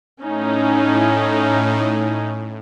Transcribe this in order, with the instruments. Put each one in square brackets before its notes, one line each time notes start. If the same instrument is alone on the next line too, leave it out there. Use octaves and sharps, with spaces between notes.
[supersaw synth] A2 [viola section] C#4 D#4